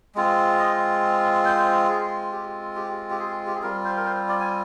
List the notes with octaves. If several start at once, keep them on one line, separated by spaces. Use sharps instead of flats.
G#3 C4 F4
D#5
C5
G#4
G4
G4
G4
G#4
G4
G#4
G3 C4 F4 A#4
C5
A#4
C5
D5
G#5